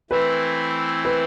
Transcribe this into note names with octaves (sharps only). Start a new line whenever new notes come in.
E3 A3 C4 E4 B4
B4